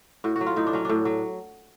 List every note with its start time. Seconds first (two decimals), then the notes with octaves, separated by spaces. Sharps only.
0.24 A2 F#4
0.36 F#3 F#4
0.46 F4
0.56 A2 D#4
0.67 D4
0.73 F#3 C#4
0.85 A2 D4
1.05 F#3